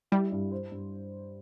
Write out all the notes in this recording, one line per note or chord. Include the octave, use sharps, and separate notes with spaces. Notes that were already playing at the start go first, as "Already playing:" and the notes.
G3 E4
G2
C5
G2